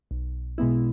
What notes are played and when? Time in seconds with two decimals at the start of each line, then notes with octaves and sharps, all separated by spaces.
0.11 B1
0.58 B2 G#3 B3 E4